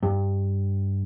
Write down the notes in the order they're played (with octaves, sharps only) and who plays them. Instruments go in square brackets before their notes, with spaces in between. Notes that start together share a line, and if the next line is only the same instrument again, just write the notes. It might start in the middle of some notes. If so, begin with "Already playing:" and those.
[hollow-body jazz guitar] G2